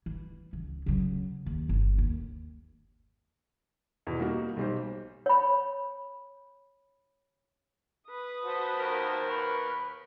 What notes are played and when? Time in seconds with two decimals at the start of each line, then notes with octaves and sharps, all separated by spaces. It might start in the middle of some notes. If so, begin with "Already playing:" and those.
0.06 E3
0.53 C#2
0.86 C#3 F#3
1.46 D#2
1.69 G1
1.98 D#2
4.07 E2 B2
4.19 G3 A#3 D#4 F#4
4.57 B1 G3 C5
5.26 C#5 B5
8.09 B4 D#6
8.43 F#4 C5 A5
8.80 D#2 A#4
9.30 B4 B5 C#6